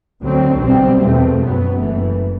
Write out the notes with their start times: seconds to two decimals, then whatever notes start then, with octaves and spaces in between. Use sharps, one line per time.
0.22 D2 D3 F#3 C4
0.61 B1 B2 G3 C4
1.00 E2 B2 A3 C4
1.39 F#2 F#3 B3
1.78 F#1 F#2 E3 A3